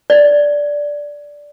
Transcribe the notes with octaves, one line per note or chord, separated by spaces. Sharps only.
D5